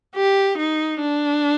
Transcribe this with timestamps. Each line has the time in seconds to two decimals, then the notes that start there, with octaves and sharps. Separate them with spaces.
0.16 G4
0.58 D#4
1.01 D4